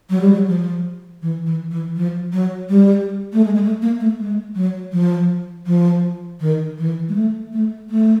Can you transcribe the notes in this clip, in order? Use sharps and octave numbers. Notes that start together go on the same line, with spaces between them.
F#3
G3
F#3
F3
E3
E3
E3
F3
F#3
G3
A3
G#3
G#3
A3
A#3
A3
G#3
F#3
F3
F3
D#3
E3
G#3
A3
A3
A3